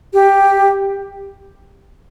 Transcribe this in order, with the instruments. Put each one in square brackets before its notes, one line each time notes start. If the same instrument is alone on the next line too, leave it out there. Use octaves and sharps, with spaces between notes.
[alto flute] G4